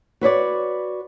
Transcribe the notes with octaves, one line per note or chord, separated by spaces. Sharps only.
F#4 B4 C#5 D5